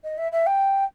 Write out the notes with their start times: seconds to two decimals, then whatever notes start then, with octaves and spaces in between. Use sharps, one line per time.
0.03 D#5
0.17 E5
0.32 E5
0.46 G5